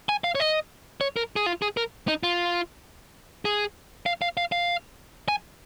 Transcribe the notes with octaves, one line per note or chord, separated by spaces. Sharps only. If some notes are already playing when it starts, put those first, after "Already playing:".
G#5
F5
C#5
D#5
C#5
A#4
G#4
F4
G#4
A#4
D#4
F4
G#4
F5
F5
F5
F5
G#5